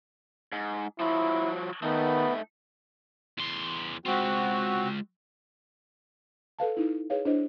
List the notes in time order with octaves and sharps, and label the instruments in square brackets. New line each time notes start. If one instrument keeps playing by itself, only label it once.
[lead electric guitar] G#2
[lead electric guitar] F3 F#3 [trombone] E4
[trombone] D#3 [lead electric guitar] A3 D#4 [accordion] B3
[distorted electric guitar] E2 C6
[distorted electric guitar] G#3 F4 [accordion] C4 F#4
[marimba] A4 B4 F5 A5
D#4 E4
G#4 B4 C#5 F5
D4 E4 C5 D#5